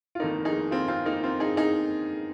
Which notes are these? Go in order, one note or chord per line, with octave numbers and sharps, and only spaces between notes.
F4
F1 F2 D#3 A#3 D#4
D#4 G#4
C4 F4
C4 F4
A#3 D#4
C4 F4
D#4 G#4
D#4 G#4